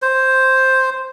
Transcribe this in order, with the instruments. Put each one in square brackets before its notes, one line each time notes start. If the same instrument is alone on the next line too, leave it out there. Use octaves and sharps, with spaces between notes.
[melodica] C5